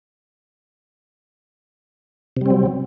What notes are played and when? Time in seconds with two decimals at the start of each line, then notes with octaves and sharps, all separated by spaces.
2.37 C3
2.41 G3
2.46 C4
2.50 F#3